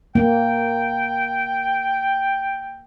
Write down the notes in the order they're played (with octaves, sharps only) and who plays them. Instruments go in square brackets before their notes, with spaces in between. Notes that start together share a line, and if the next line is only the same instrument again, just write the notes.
[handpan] A#3 [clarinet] G5